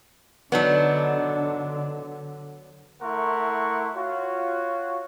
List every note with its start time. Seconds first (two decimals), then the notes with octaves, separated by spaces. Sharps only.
0.52 D3 F#3 B3 D4 D#4 A4
3.02 A3 E4 A#4 F#5 C6 C#6
3.95 F4 F#4 C#5